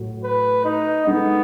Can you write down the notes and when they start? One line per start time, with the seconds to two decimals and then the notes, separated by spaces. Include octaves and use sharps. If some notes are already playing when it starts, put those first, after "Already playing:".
Already playing: A2 F#3
0.24 B4
0.65 D#4
1.07 G#3 B3 D#4 A4